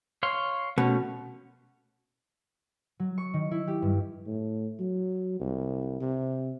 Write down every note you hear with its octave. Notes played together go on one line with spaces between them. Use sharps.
C#5 F5 C6
B2 A3 C#4
F#3
C#6
D#3
E4
G4
G2
A2
F#3
C2
C3